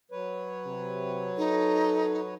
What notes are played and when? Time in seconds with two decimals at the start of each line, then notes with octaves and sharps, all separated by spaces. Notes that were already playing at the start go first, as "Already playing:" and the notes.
0.11 F#3 B4 C#5
0.65 C3
1.38 D#4 A4